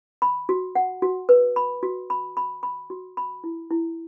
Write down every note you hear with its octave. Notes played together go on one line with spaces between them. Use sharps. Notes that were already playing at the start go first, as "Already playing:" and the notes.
B5
F#4
F#5
F#4
B4
B5
F#4
B5
B5
B5
F#4
B5
E4
E4